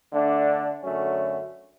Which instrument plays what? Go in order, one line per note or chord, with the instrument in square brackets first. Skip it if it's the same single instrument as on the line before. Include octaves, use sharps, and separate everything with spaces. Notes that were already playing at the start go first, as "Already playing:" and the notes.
[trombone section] D3 A3 D4
F#2 D3 F#3 A3 C#4